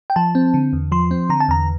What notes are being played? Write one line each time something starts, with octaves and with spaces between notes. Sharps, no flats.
G5
F3 A5
C4
D3
E2
F3 C6
C4
D3 A#5
A5
E2 A#5